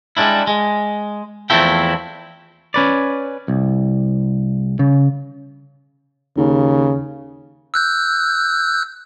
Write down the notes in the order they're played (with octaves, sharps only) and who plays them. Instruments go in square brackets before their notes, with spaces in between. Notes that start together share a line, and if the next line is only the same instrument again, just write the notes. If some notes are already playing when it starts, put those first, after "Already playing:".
[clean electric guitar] G3 G#3 C4 D4 E4
G#3
E2 F3 A3 C4 E4 G5
C#4 B4 D5
C2
C#3
[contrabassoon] D#2 [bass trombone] C#3
[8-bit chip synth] E6 F#6 G6